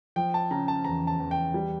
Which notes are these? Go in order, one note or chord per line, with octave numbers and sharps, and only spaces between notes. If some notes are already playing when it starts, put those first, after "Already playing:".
F3 G5
A5
C#3 A#5
A5
E2 A#5
A5
E2
G5
G3